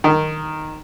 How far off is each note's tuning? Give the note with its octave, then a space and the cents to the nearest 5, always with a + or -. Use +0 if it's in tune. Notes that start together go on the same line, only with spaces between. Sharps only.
D#3 -5